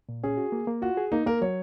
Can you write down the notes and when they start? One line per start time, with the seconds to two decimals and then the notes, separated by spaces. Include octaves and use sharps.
0.09 A#2
0.23 C#4 G#4
0.37 F#4
0.52 A#3
0.67 A#3
0.82 F4 F#4
0.97 G#4
1.12 A#3 D#4
1.26 A#3 A#4
1.42 F#3 C#5